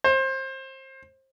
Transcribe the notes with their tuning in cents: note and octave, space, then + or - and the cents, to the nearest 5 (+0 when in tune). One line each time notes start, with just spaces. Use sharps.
C5 +25